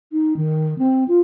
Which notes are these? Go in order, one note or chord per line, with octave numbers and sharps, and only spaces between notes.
D#4
D#3
C4
F4